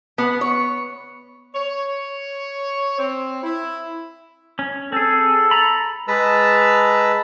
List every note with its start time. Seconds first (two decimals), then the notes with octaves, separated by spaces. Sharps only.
0.18 B3
0.41 C#5
1.55 C#5
2.99 C4
3.43 E4
4.59 C#4
4.92 C4 G#4 A4
5.51 A#5 B5
6.08 G#3 B4 A5 A#5 E6